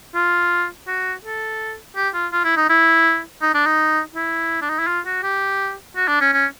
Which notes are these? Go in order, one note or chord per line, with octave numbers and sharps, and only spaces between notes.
F4
F#4
A4
G4
F4
F4
E4
D#4
E4
D#4
D4
D#4
E4
D4
D#4
E4
F4
F#4
G4
F#4
D4
C#4
C#4